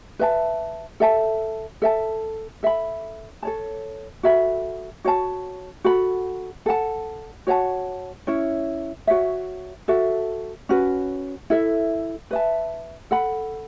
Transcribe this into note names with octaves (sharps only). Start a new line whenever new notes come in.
B4 E5 A5
A4 E5 A5
A4 E5 A5
A4 E5 B5
A4 C#5 A5
F#4 A4 E5 B5
F#4 C#5 A5
F#4 A4 F#5 B5
A4 F#5 A5
F#4 C#5 F#5 A5
C#4 E4 C#5
F#4 C#5 E5
F#4 A4 E5
C#4 F#4 B4
E4 A4 E5
B4 E5 A5
A4 F#5 B5